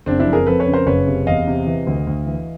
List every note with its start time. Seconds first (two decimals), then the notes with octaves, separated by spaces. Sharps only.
0.06 F#1 C4 D4
0.20 D4 E4
0.26 F2
0.33 G#4 A#4
0.46 F2 A4 B4
0.60 B4 C#5
0.66 C#3
0.74 A#4 C5
0.86 F#1 B4 C#5
1.07 C3
1.27 E2 D#5 F5
1.47 C3
1.67 E3
1.87 D2
2.07 D2
2.26 E3